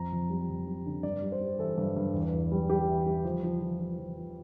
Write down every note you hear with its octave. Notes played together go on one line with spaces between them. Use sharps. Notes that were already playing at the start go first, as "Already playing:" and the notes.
Already playing: F2 A#5
F2
G3
F2
G3
D3
G2 D5
G3
C5
G3
E3 A4
G2
G2
E2
E2
G3
G3 G4
E3
G3
F3
F3
F3
F3
F3
F3